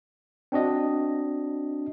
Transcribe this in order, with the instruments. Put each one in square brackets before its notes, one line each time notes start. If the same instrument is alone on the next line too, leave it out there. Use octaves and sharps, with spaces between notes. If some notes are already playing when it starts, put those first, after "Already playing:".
[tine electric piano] C4 D4 F#4 D#5